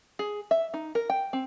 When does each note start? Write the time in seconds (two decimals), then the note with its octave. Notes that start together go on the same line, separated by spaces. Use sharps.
0.19 G#4
0.51 E5
0.74 D#4
0.95 A#4
1.10 G5
1.33 C4